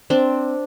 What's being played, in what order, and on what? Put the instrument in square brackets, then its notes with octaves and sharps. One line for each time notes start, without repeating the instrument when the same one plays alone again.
[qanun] C4 D4